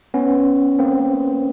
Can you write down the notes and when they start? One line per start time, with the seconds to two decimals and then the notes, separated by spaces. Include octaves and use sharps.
0.14 B3 C#4
0.79 A#3 C4